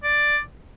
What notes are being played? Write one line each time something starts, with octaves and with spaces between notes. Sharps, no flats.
D5